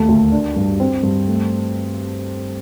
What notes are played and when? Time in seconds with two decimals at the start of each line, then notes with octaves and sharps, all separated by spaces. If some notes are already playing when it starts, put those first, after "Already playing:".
Already playing: D#2 A3
0.08 D2
0.32 D4
0.56 G2
0.80 C4
1.03 G2
1.27 A3